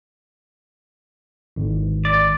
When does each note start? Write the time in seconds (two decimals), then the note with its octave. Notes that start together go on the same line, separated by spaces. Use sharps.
1.56 G#1
2.05 D5